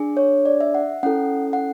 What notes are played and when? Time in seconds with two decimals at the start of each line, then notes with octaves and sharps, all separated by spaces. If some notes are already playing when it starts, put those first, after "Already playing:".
Already playing: D4 G#4
0.17 C#5
0.46 D5
0.61 E5
0.74 F#5
1.03 C#4 E4 A4 F#5
1.53 F#5